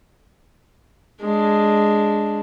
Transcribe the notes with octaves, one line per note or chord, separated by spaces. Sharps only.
G#3 D4